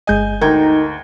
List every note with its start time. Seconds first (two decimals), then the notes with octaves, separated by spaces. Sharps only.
0.07 G1 G#3 D#5 G#5 G6
0.41 D2 D#4 A#4 G5 G#6